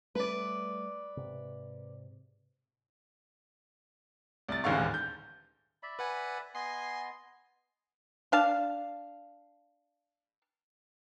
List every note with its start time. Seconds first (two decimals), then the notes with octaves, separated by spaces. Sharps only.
0.15 G3 A3 B4 D5
1.17 G#2 C3
4.48 C2 A6
4.64 D#1 A1 D2 G#2 F5 C#6
4.94 G6
5.83 D5 E5 B5
5.99 B4 F#5 G#5
6.55 B3 D#5 G#5 C6 C7
8.32 D4 F5 A5